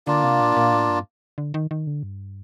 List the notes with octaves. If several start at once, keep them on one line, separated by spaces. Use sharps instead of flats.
D3 A#3 D4 F4
C3
A#2
A#2
A2
G2
D3
D#3
D#3
D3
G2